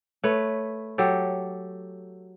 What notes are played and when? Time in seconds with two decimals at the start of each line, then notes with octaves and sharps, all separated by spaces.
0.24 A3 B4 C#5
0.98 F#3 G4 A4